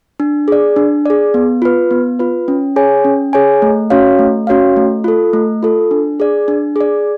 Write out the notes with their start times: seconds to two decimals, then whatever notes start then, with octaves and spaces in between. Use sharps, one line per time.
0.20 D4
0.48 G#4 D5
0.76 D4
1.06 G#4 D5
1.34 B3
1.62 F4 B4
1.91 B3
2.19 F4 B4
2.48 C#4
2.76 G#4 C#5 G#5
3.04 C#4
3.33 G#4 C#5 G#5
3.62 A3
3.90 C#4 F#4 C#5 F5
4.19 A3
4.47 C#4 F#4 C#5 F5
4.76 A3
5.04 F4 A4
5.33 A3
5.63 F4 A4
5.91 D4
6.20 G#4 D5
6.48 D4
6.76 G#4 D5